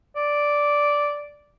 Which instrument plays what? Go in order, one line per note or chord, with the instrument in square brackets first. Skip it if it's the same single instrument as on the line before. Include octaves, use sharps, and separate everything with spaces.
[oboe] D5